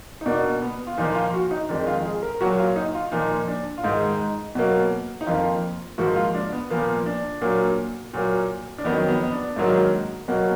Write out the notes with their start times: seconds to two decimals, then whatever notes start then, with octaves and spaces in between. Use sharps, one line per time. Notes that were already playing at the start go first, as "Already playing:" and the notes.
0.21 D#4
0.26 B2 A#3 D4
0.62 B3
0.87 F4
0.97 A#2 F3 A#3 D#4
1.15 F4
1.34 F#4
1.51 D#4
1.69 F2 D#3 G#3 D4
1.87 F4
2.05 G#4
2.23 A#4
2.41 A#2 F#3 A#3 F#4
2.59 F4
2.76 D#4
2.95 F4
3.12 A#2 F3 A#3 D#4
3.48 D4
3.78 F4
3.84 G#2 D#3 G#3 D#4
4.55 B2 F#3 A#3
5.21 D#4
5.27 F2 F3 A#3 F4
5.98 G#2 F3 A#3 F#4
6.16 F4
6.35 D4
6.52 B3
6.70 A#2 F3 A#3 B3
7.06 D4
7.41 A#2 F#3 A#3
8.13 A#2 F#3 A#3
8.78 D4
8.84 F2 D#3 F#3 B3
9.08 B3
9.23 B3
9.32 D4
9.56 G#2 D#3 F#3 A#3
10.28 B2 F#3 A#3